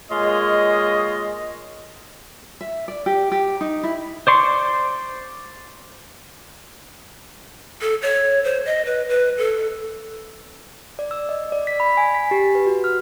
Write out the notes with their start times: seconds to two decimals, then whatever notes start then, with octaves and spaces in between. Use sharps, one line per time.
0.11 G#3 A#3 F4 C#5 D#5
2.61 E5
2.88 D5
3.06 G4
3.32 G4
3.61 D#4
3.83 E4
4.27 C5 D5 C6 C#6
7.81 A4
8.02 C#5
8.44 C5
8.66 D#5
8.85 B4
9.09 B4
9.38 A4
10.99 D5
11.11 E6
11.29 D#5
11.52 D5
11.67 B6
11.80 B5
11.97 G#5
12.15 B6
12.31 G4
12.55 B4
12.67 F#4
12.84 F6